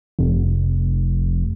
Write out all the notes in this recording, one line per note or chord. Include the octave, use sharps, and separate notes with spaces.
F1